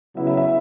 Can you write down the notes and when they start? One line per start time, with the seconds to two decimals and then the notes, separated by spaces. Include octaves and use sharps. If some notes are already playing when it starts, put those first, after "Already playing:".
0.16 C#3 F#3 B3 E4 E5
0.27 E5
0.37 E5